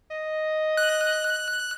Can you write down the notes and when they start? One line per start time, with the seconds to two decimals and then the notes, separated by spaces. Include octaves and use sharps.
0.11 D#5
0.77 F#6